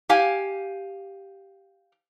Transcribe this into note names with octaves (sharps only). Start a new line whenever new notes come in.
G4 F5 G#5